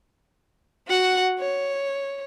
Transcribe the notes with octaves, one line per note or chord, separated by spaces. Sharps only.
F#4 F#5
C#5